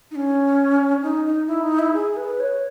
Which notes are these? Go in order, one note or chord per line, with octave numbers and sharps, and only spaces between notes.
D#4
C#4
D#4
D#4
E4
D#4
E4
G#4
B4
C#5